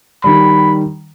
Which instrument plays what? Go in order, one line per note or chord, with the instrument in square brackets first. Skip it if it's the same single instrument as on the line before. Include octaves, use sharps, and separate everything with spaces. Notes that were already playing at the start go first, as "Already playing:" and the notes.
[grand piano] D#3 G3 [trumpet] B5